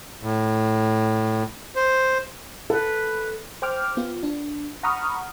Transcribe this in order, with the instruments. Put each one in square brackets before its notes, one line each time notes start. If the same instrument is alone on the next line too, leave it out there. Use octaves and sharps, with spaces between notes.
[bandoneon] A2
C5
[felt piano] A4 [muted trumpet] B4
[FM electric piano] C5 G5 D6 F6
B3 F4
D4
F#5 A#5 B5 C#6 D#6 F6